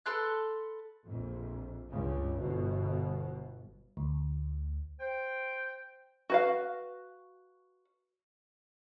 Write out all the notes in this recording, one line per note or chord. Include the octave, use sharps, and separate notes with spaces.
A4 B4 C6 F#6
A#1 F2
C#2 G2 C#3
G1 B2
D2
C5 G5
F#4 B4 F5